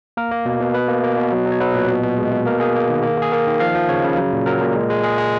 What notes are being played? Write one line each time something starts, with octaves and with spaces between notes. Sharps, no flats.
A#3 A#4
A#3
B2
B2
B2 B4
A#3
A#3
B2
F#3
F#3
C#5
F#3 B4
A#2
B2
B2
G#3
B2
A#3 A#4
A#3 G#4
A#3
D#3
A#3
A#3 G#4
A#3 A#4
D#3
F3 F5
F3
C#3 C#5
C#3
F#3
A#2
F#3 A#4
A#2
G#3
G#3
G#3 G#4
G#3